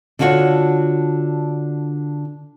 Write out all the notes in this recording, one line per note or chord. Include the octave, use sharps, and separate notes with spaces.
D3 D4 F4 F#4 C#5